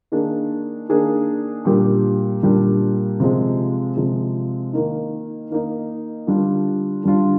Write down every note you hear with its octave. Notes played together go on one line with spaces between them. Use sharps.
D#3 A#3 D4 G#4
D#3 A#3 D4 G#4
A#2 G3 D4 G4 A#4
A#2 G3 D4 G4 A#4
C3 F3 G#3
C3 F3 G#3
D#3 A#3 D#4
D#3 A#3 D#4
D3 G3 D4 F4
D3 G3 D4 F4